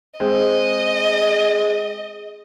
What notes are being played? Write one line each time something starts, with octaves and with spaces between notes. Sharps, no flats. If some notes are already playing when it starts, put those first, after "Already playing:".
G#3 C4 D#5